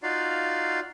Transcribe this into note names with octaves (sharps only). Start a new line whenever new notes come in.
D#4 F4 F#4 D5 F5